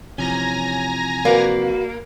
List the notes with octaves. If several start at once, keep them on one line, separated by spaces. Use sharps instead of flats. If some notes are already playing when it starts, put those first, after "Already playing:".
C3 E3 F3 C#4 G#5 A#5 A#6
A#3 F#4 B4 D5